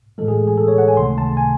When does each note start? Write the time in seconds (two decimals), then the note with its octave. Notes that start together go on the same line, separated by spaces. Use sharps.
0.18 A2 E3 G#3 A4
0.28 G#4
0.48 G#4
0.57 A4
0.68 C#5
0.78 F#5
0.88 G#5
0.97 C#2 C3 D#3 A3 C6
1.18 A5
1.37 G#5